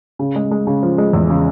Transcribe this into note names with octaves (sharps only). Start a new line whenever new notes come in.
C#3
G#3
G#3
C#3
F3
G#3
E2
C#3